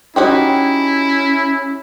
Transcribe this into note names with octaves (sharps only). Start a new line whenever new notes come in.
C#4 D#4 E4 F#4 G4